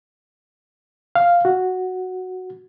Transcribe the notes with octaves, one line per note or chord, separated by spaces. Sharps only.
F5
F#4